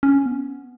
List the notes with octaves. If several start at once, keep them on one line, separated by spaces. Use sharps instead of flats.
C#4
B3